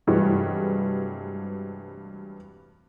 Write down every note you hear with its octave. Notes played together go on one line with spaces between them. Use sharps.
G2 C3 E3 F#3 G#3 A3